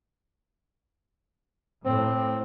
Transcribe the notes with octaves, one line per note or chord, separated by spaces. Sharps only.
A2 C4